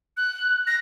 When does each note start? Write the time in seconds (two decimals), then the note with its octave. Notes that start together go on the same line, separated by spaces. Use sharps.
0.17 F#6
0.67 A#6